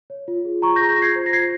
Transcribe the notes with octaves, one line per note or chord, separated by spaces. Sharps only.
C#5
F4
G#4
F4 A#5 C#6
G6 A#6
G#4
G6 A#6
F4 G#6 C7
C5
A#6
F4 G#6 C7